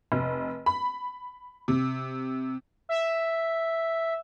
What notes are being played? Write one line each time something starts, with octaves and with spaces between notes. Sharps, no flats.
F1
B5
C3
E5